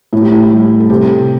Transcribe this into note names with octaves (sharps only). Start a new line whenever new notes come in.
A2 E4
G4
E4
G3
A4
C3 G4